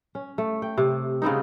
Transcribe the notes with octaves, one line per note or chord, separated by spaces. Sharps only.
C#4
A3
G5
C3
C#3 B3 C4 D#4